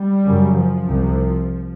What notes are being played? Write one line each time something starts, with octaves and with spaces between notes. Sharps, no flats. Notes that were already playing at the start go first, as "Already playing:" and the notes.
Already playing: G3
F#2 C#3
F3
C2 C3